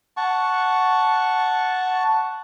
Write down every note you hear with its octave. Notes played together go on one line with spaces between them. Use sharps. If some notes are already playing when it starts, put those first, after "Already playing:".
F#5 A5 C#6